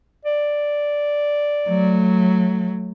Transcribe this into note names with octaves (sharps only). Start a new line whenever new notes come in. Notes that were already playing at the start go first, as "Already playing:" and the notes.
D5
F#3 A3